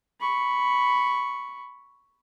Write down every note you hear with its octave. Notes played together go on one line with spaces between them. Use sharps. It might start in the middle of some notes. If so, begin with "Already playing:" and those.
B5 C#6